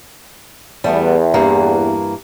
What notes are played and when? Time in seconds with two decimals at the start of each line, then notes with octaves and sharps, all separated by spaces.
0.84 E2 G3 A3 B3
1.34 G2 E3 A#3